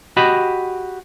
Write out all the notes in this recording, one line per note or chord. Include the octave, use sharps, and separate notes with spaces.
F#4 G4 D#5 B5